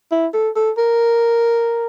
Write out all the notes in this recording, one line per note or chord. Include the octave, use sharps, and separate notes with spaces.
E4
A4
A4
A#4